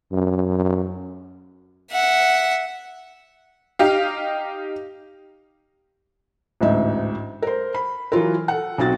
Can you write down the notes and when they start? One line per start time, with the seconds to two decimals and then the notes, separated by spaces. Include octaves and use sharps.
0.12 F#2
1.91 E5 F#5
3.79 D#4 G4 F5
6.61 A1 D2 G#2 D#4 E5
7.42 A#4 C5
7.74 B5
8.12 E3 F#3 F4 A#4
8.48 A4 F#5
8.78 B1 C4 F#4 A6